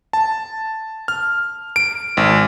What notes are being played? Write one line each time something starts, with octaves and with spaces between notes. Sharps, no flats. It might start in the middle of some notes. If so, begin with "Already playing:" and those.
A5
F6
D7
G#1